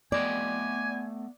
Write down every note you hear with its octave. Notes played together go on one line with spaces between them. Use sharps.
A3 B3 D5 D#5 G5 G#5